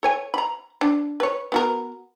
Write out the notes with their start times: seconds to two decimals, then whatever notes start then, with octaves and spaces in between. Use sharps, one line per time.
0.03 A4 C#5 G#5
0.34 A#5 B5
0.81 D4
1.20 B4 C#5
1.52 B3 F#4 A#4